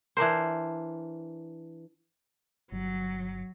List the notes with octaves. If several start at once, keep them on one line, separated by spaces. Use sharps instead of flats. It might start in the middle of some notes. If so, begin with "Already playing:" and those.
E3 D4 A#4 C5
G1 F#3